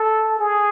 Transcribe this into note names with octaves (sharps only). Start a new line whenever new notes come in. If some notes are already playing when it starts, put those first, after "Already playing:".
Already playing: A4
G#4